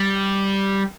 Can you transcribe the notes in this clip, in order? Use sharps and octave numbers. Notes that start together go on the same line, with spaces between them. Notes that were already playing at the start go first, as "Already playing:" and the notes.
Already playing: G3